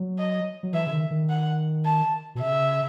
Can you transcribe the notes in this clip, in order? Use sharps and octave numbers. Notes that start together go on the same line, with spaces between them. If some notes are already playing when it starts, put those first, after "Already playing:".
Already playing: F#3
D#5
F#3
E3 E5
C#3
D#3
D#3
F#5
A5
B2
C#3 E5